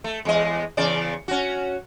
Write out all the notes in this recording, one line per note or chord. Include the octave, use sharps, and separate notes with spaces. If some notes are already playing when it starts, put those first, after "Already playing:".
A3
E2 G#3 D#5
E2 C#3 D5
C#4 F#4